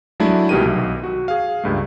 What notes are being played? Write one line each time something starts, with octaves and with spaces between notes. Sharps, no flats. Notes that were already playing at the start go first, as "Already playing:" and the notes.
F#3 G#3 A3 D4 E4
C2 B2 D#3 G4 A#4 D#7
B1
F#4
G#4 F5
C#2 G2 A3